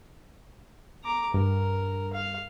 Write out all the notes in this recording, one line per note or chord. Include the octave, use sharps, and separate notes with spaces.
A#5 D6
G2 A#4
F5